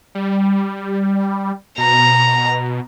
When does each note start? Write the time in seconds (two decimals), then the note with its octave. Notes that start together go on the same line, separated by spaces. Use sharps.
0.15 G3
1.78 B2 A#5